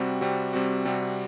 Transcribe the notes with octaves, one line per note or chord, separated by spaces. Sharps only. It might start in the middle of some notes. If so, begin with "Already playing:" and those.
Already playing: C3 G3 C4 F#4
C3 G3 C4 F#4
C3 G3 C4 F#4
C3 G3 C4 F#4